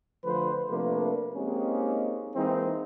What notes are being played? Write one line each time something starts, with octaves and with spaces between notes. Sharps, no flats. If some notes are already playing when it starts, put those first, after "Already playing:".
D3 F3 A3 B4 C5
C3 F3 A3 A#3 D4 B4
G#3 A#3 C4 C#4 D#4 G4
E3 G#3 A#3 C4 D#4 E4